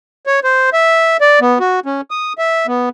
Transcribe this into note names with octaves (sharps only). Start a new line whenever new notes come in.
C#5
C5
E5
D5
B3
F#4
C#4
D#6
E5
B3